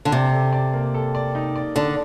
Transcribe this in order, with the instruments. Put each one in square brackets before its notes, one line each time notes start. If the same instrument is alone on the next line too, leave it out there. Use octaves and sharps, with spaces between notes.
[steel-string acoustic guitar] D3
[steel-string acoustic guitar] C3 [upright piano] D5
[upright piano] A4
D5
A#3
A4
D5
D#4
D5
[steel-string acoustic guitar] D3 [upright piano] D5